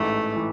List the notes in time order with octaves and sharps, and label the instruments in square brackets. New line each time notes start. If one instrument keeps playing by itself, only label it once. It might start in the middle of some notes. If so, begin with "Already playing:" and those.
Already playing: [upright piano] A1 G#2 E3 [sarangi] A3
[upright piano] E3